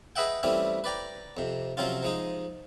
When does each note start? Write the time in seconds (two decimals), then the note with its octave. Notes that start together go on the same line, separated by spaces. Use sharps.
0.16 G#4 B4 D#5 E5 F#5 G5
0.43 E3 G3 A3 C4 C#4
0.84 B4 D5 G5 A#5
1.37 F2 C3
1.77 C3 F3 F#3 C4 C#4 F4
2.03 F3 G#3 D#4